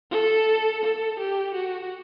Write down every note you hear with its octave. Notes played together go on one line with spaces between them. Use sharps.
A4
A4
G4
F#4